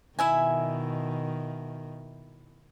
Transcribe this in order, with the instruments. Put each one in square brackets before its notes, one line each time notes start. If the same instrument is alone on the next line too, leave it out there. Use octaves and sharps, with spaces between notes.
[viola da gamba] B2 D#3 [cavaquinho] E4 E5 G#5